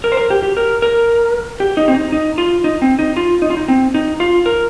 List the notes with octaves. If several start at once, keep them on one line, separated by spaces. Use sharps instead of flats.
A#4
C5
A#4
G4
G4
A#4
A#4
G4
D#4
C4
D#4
D#4
F4
D#4
C4
D#4
F4
D#4
F4
D#4
C4
D#4
F4
A#4